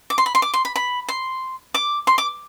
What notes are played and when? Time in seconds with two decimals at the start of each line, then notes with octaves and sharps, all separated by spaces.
0.10 D6
0.18 C6
0.26 B5
0.35 C6
0.42 D6
0.54 C6
0.65 B5
0.76 B5
1.09 C6
1.74 D6
2.07 C6
2.18 D6